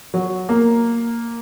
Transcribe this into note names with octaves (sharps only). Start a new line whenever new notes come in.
F#3
A#3